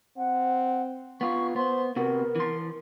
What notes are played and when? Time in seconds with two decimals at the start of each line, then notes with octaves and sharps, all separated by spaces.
0.17 C4 F#5
1.21 B3 F4 C#6
1.56 B3 C5 C6
1.96 C3 B3 F#4 A#4
2.36 E3 C6